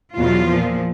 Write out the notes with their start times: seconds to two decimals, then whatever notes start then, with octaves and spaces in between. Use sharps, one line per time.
0.16 E2 B2 F#3 F4
0.46 A#2 F3